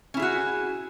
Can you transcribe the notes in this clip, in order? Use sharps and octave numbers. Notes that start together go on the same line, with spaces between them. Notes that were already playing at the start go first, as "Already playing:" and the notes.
C#4 E4 F#4 G#4